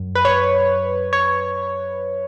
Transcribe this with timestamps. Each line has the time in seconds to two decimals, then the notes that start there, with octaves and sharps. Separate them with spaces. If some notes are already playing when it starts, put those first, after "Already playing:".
Already playing: F#2
0.15 B4
0.25 C#5
1.13 C#5